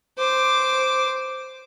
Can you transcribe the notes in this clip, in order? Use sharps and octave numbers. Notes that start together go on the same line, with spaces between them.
C5 D6